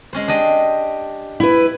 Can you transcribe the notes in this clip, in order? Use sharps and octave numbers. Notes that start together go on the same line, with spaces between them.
G#3 C#4 C5
D4 G4 D#5
E4 B4